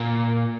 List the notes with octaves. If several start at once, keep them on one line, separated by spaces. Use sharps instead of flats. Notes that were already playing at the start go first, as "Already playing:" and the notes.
Already playing: A#2